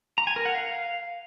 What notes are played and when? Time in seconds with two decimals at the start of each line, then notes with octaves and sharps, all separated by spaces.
0.18 A#5
0.27 G#5
0.36 A#4
0.45 F#5
0.55 F5